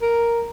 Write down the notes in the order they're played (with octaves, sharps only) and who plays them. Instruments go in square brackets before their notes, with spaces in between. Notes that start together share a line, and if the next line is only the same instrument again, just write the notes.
[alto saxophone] A#4